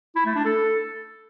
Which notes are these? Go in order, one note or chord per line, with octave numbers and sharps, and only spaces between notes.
E4
A3
D4
A4